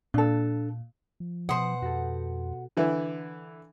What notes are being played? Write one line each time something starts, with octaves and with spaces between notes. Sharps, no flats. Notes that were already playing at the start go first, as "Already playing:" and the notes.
A#2 D4 A4
F3
B2 C5 F#5 D#6
F2 F#4 G4 A4
D3 E3 E4